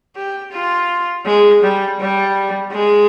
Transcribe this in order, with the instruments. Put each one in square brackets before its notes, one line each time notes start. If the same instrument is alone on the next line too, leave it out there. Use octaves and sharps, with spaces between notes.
[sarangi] G4
F4
G#3
G3
G3
G#3